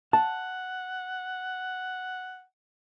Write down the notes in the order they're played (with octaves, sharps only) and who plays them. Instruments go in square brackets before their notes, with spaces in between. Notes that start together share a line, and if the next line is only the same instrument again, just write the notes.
[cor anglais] F#5 [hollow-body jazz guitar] A5